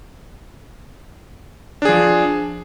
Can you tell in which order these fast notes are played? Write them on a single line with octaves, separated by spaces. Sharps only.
D4 G#4 F3